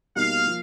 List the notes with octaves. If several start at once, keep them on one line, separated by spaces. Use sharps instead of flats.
B2 G3 A#3 D#4 F5
F3 A#3